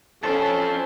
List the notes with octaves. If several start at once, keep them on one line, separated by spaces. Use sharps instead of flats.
F2 C#4 A4 C5 A5